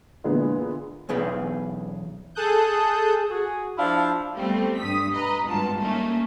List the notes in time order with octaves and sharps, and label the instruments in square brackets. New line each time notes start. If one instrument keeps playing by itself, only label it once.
[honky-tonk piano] A#2 D3 E3 G#3 A#3 B3
[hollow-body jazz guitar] B1 E2 G#4 B4 B5
[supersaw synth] G#4 A4 A5 D#6 F#6 G6
[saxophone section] F#4 G#4
F3 D4 E4 F5
[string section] G3 A3 B3 C4
G2 D#6 B6
B4 D#5 A#5
G#1 G2 B2 F4 A5
A3 A#3 C#4 D#4